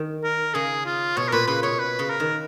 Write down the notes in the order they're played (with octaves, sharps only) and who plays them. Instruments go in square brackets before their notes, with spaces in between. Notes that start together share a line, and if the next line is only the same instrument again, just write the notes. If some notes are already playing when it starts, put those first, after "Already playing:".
Already playing: [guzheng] D#3
[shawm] A#4
[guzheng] C#3 [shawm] G#4
[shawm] F4
[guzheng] B2 [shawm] C#5
[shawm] A#4
[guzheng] A#2 [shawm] B4
[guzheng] C#3 [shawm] B4
[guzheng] B2 [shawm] C#5
[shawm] B4
[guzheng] C#3
[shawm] A#4
[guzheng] D#3